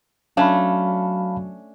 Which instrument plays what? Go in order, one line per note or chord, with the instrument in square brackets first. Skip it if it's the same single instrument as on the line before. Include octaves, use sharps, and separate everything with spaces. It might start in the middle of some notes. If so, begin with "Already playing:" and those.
[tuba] F#3 [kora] A3 C#4 D4 [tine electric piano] F5 A5 B5